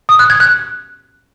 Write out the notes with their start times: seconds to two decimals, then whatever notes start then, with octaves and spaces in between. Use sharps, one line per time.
0.09 D#6
0.19 F#6
0.30 G#6
0.40 F#6